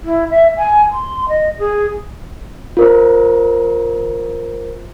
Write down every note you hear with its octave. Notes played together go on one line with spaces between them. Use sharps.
E4
E5
G#5
C6
D#5
G#4
F4 A#4 C5